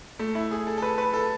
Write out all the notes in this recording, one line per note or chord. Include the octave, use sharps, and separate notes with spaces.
A3
E4
G#4
A4
A4
B4
B4
A4